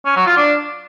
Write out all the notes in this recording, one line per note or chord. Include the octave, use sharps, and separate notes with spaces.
C#4
F#3
F4
D4